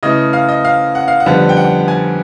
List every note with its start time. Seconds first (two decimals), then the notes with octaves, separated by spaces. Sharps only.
0.03 C#3 E3 A3 D#5
0.33 F5
0.49 D#5
0.64 F5
0.95 F#5
1.08 F5
1.20 F#5
1.26 F2 D3 G3 B3
1.49 G5
1.57 F#5
1.88 G#5